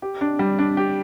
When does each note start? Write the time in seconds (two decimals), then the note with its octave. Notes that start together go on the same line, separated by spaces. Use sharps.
0.02 G4
0.21 D4
0.39 G3
0.59 D4
0.77 G4